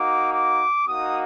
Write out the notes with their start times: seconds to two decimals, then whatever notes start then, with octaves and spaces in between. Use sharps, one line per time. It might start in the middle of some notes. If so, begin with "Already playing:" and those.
Already playing: A#3 D#4 F#4 D6
0.31 D6
0.87 A#3 D#4 F#4 D#6